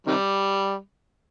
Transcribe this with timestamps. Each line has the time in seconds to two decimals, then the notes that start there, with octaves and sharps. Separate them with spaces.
0.07 C3 D#3 G3